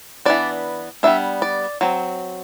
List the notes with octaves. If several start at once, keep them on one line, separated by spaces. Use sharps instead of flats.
E3 B3 D4 D5
G3 B3 D4 E5
D5
F#3 C4